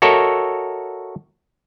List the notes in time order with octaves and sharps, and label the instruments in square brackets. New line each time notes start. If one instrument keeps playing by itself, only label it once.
[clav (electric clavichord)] F#4 A4 A#4 C#5 D#5 E5